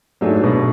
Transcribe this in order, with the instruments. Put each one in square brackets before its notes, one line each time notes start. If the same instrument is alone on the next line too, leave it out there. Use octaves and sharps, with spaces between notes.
[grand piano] G#2 [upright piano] F#3 A3 D4 G#4
[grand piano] B2